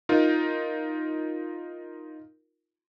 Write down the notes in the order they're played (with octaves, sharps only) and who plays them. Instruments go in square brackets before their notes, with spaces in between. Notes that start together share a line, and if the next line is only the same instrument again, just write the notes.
[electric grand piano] D#4 F4 A#4